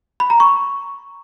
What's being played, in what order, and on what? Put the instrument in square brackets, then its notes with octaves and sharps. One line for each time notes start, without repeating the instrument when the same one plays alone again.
[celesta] B5
A#5
C#6